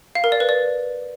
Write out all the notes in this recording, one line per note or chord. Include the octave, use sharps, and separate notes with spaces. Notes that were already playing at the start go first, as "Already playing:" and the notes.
F5
A#4
D5
B4
D5